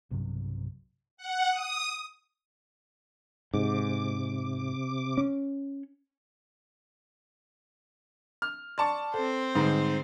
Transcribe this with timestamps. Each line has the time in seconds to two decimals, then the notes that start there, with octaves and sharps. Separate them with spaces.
0.11 B1 G2 C3 F#3
1.17 F#5
1.51 D#6
3.54 G#2 C3 D6
5.17 C#4
8.42 F6
8.78 D5 A5 C6 C#6
9.14 C4 A4 C5
9.55 G#2 D3 G3